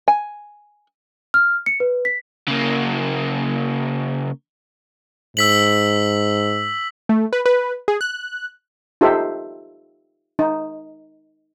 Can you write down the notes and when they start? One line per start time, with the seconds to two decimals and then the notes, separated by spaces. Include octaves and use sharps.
0.08 G#5
1.34 F6
1.66 C#7
1.80 B4
2.05 B6
2.48 C#3 A#3
5.37 G#2 E6 B6 F#7
7.09 A3
7.33 B4
7.46 B4
7.88 G#4
8.01 F#6
9.01 D#4 F4 G4 A4 C5 E5
10.39 D#4